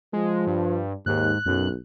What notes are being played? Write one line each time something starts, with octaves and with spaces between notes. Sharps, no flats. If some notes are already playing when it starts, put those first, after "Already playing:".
F3 G#3
G2
D#2 G#2 F#6
B1 F#2